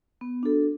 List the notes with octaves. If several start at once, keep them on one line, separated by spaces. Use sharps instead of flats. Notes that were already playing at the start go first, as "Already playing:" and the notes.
B3
D4 F#4 A4